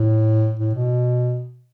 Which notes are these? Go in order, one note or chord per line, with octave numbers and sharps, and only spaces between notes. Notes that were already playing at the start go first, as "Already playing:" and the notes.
Already playing: A2
A2
B2